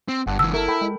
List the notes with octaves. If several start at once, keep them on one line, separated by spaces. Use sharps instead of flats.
C4
G1 G2 F#5 A5
C#2 E3 A5 E6
E4 A4 A#4
A4 G5 B5
G#3